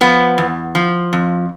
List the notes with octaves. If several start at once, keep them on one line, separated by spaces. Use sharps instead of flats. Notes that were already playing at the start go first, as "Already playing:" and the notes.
F3 B3
E2
F3
F2